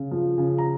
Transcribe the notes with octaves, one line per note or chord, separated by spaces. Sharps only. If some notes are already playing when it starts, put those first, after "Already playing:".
Already playing: C#3
F3
C#3
A#5